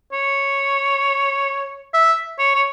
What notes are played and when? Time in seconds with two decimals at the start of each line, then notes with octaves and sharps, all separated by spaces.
0.12 C#5
1.94 E5
2.39 C#5
2.55 C#5